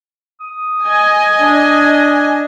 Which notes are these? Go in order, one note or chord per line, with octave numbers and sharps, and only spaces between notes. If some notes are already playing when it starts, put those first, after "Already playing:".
D#6
D#5 G#5
D4